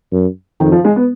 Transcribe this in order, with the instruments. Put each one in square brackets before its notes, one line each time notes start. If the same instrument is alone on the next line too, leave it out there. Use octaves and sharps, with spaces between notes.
[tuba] F#2
[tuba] F2 [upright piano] D#3
[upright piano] F3
G#3
B3